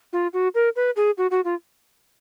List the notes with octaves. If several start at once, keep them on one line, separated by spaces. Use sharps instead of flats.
F4
F#4
A#4
B4
G#4
F#4
F#4
F4